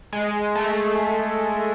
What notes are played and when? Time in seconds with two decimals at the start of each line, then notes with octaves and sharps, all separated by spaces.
0.13 G#3
0.55 A3